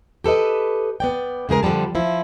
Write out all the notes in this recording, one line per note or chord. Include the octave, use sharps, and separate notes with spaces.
G4 A4 B4 D#5
B3 D5 G5
C#3 G#3 G#4 A#4
F2 D3 F3 G3 A5
F3 E4